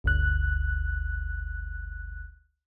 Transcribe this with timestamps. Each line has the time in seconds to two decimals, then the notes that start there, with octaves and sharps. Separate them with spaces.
0.04 G1 D2 F#6